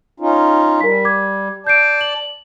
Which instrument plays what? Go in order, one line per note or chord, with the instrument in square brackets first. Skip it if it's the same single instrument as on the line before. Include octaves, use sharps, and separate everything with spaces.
[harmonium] C#4 D#4 F4
[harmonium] G3 [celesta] A#4 B6
[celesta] D6 G#6
[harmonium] D5 A5 [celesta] G6 C7 D7
[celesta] F#7